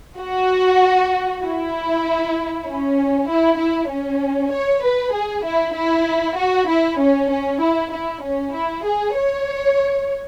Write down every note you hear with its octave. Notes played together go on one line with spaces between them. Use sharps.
F#4
E4
C#4
E4
E4
C#4
C#5
B4
G#4
E4
E4
F#4
E4
C#4
C#4
E4
E4
C#4
E4
G#4
C#5